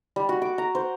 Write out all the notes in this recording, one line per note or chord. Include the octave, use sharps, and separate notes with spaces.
G3
F#4
D6
A#5
C5